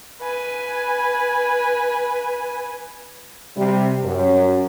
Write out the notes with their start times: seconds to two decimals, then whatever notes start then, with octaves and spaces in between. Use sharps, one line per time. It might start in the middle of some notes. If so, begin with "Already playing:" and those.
0.21 B4 G#5
3.57 C3 G3
4.05 F#2